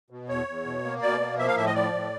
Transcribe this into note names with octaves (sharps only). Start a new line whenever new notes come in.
B2
E2 C#5
E2
B2
A#3
B2 D5
A#3
F3 E5
F5
A2 E5
D#5
F3 D5
A2